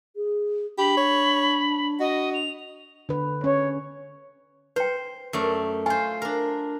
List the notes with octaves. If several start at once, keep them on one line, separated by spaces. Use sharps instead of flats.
G#4
D4 G4 B5
C#5
F#4 D#5
F7
D3 B4
C#4 C#5
B4 C5 G5
F#2 A3 D5
F4 C5 G#5
D4 A#4